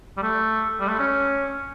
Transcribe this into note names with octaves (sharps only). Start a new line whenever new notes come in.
G3
A3
G3
A3
C#4